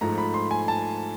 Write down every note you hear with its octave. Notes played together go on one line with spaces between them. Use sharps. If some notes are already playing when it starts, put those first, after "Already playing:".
G#2 F3 A3 A#5
B5
C6
G#5
A5